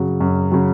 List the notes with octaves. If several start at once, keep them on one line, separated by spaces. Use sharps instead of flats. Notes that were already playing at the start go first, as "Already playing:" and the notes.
Already playing: F#2 C#3 F#3
F#2
C#3 F#3